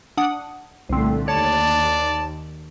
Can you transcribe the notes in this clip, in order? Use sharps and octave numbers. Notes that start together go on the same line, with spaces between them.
D4 F#5 D#6
C2 A#2 D3 A3 C4
D#2 C#5 D5 A5